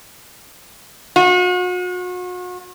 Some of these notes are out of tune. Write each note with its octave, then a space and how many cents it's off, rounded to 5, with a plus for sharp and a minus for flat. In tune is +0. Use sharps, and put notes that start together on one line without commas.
F#4 -40